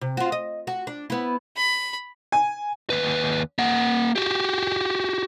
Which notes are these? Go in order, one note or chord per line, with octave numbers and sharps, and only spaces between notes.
C3
F4 F#4
D#5
F#4
D4
B3 E4
B5
G#5
D#2 B4
A#3 F#5
F#4 G4